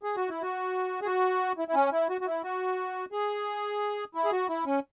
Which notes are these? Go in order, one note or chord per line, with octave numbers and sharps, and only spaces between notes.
G#4
F#4
E4
F#4
G#4
F#4
E4
E4
C#4
E4
F#4
F#4
E4
F#4
G#4
E4
G#4
F#4
E4
C#4